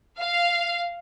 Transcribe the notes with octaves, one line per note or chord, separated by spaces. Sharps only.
F5